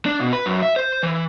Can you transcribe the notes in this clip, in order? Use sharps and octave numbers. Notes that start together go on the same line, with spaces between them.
D4
B2
B4
F#2
E5
C5
E3